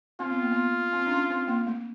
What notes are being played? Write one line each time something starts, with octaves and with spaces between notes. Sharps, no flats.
C4 F4
B3
A#3
B3
C4
D4
C#4
C4
A#3
A3